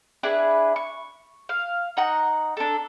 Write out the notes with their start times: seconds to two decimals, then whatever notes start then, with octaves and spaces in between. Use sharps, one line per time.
0.23 D4 E4 G#4 B4
0.76 C#6
1.49 F5
1.97 D#4 F#5 A#5
2.57 D4 A4